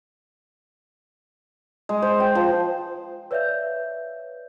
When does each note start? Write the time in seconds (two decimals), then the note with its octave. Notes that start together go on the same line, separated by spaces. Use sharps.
1.89 G#3
2.02 C5
2.20 G5
2.35 F3
3.31 B4 C#5 D5 E5 F5 G6